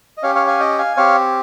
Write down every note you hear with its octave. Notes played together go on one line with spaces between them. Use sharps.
D#5
C#4 G4 C#5 F5
C#5 F5
F5 G#5
D#5 G5
F5 G#5
C4 G4 C#5 F5